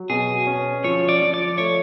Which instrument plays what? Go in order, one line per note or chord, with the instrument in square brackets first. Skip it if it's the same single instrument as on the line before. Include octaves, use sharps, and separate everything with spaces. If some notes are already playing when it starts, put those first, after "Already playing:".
Already playing: [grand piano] F#3
[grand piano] B2 [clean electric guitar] G#4
[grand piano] C#4
[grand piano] F3 [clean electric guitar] C#5
[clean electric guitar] D5
[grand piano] F3
[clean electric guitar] D5
[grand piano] A3 [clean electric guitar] C#5